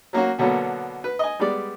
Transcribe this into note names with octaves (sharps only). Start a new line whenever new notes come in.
F#3 A#3 C#4 F#4
B2 D3 F#3 A#3 B3
B4
D#5 G#5
G3 G#3 B3 D5